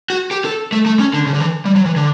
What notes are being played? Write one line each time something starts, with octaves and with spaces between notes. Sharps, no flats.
F#4
G4
A4
A3
A3
C#4
D3
C#3
D3
E3
G3
F#3
E3
D3